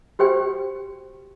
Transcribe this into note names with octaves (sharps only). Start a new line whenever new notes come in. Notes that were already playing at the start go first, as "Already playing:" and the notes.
F#4 G4 C5 G5